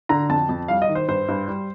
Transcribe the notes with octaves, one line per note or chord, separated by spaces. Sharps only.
D3 A#5
F2 A5
F2
G3 F5
D#5
D#3
C5
G2 C5
G2
G3